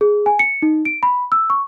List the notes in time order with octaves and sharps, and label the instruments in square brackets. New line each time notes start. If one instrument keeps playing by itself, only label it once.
[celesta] G#4
G#5
C#7
D#4
D7
B5
E6
C#6